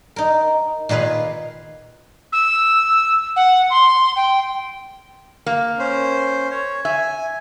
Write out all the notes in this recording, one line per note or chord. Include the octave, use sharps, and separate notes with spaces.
D#4 A#4
A#2 D#3 G#4 B4 F5
E6
F#5
C6
G5
A#3
C#4 C5
C#5
E5 G#5